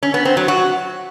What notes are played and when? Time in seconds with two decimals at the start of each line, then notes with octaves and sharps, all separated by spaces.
0.03 C#4
0.14 B3
0.25 C4
0.37 F#3
0.48 F#4